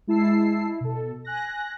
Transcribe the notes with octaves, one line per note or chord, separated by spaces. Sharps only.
G#3 E4 A5 E6 C7
E4
B2 A4
G#5 F#6 A#6